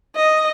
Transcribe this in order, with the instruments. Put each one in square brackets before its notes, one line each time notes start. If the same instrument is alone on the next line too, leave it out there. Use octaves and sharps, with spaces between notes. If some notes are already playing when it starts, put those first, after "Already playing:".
[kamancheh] D#5